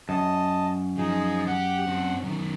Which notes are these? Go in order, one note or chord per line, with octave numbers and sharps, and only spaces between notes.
F#2 D#5 A5
F3 D#4 G#4
G4 F#5
C4 D4
F#2 D#3